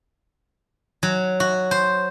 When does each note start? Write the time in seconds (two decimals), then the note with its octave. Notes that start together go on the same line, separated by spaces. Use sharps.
1.03 F#3
1.40 F#4
1.71 C5